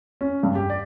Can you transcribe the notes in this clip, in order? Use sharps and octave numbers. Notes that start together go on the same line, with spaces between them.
C#4
G2
G4
D5